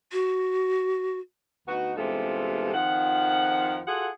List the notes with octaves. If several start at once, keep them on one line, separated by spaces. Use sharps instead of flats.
F#4
D2 B3 D#4 F#4
E2 G2 C3 G#3 F4 A4
F2 D#3 F3 F#5
F4 F#4 G#4 A4 F#5